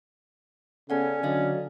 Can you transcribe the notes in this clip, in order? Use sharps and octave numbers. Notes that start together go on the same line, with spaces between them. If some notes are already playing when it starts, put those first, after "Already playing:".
C#3 B3 C#4 A4 D5 F#5
D3 F#3 D5 D#5 F5